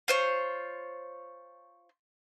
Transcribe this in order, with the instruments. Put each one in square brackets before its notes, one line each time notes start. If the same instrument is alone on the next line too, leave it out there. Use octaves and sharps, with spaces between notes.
[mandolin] F4 C5 C#5